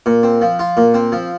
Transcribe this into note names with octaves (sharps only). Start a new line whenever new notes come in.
A#2
C4
F3
F4
A#2
C4
F3